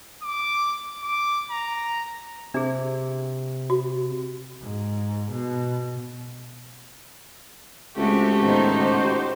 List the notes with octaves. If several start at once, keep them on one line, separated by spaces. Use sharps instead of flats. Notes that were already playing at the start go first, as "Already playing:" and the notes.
D6
D6
A#5
C3 D4 G#4
F#4
G#2
B2
C#2 G#3 A3 C4 F#4 G4
A2 D#3 B3 D#4 C5
F#4 G4 C5